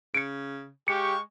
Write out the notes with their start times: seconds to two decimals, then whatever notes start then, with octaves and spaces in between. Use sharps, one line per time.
0.14 C#3 C#7 D7
0.88 G#3 G4 F5 G5 C#6 C#7